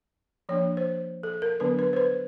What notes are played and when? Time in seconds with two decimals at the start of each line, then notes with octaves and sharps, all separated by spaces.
0.49 F3 A#3 D4 C#5
0.77 C5
1.23 A4
1.42 A#4
1.60 D3 F#3 B3 D4 B4
1.79 B4
1.93 C5
1.97 B4